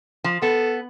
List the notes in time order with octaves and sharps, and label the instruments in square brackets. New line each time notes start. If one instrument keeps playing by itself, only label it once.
[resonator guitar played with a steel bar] F3
[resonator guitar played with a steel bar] B3 [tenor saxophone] A4